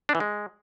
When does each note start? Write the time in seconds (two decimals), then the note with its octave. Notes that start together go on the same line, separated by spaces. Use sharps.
0.09 D4
0.15 E3
0.20 G#3